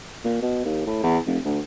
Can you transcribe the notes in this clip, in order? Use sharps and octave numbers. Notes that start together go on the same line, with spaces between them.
A#2
B2
D#2
A2
E2
F1
D2